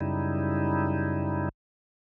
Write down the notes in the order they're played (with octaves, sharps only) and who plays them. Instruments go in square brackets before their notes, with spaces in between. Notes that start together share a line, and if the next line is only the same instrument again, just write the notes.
[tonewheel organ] F#2 C#3 G3 D#4 E4